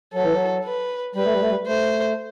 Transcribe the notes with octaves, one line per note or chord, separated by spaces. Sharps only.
F#3 A4
E3
F#3
B4
G3 B4
A3
G3
A3
G3
A3 C5